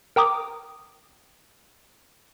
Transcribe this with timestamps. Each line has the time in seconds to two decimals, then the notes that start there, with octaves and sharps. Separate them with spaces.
0.16 A#4 G5 A#5 D6 D#6